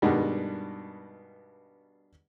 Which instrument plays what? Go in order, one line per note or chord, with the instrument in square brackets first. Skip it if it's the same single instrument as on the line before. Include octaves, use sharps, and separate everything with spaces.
[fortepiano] G2 B2 D#3 G3 G#3